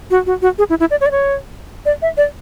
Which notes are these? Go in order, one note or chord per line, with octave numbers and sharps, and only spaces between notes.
F#4
F#4
F#4
G#4
E4
E4
D5
C#5
D5
C#5
D5
E5
D5